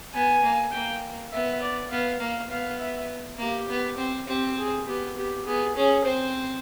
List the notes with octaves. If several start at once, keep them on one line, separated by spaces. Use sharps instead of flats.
B3 G#5
A#3
A#3 G5
B3 E5
D5
B3 F5
A#3 F5
B3 F5
E5
A#3 G4
B3
C4
C4 G4
G#4
B3 G4
B3 G4
B3 G#4
C#4 G#4
C4 C5